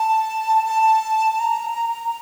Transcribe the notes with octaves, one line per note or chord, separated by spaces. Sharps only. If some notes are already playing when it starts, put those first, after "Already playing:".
Already playing: A5
A5
A#5